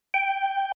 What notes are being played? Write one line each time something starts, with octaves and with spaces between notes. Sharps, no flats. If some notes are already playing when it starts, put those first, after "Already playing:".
G5